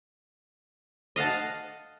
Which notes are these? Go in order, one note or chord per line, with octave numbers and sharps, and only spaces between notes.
D#5 F5 F#5 A5